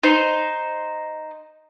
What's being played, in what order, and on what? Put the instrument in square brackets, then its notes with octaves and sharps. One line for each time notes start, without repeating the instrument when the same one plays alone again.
[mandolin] D#4 C5